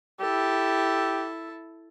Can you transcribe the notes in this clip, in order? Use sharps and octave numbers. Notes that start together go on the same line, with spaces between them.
E4 G4 A4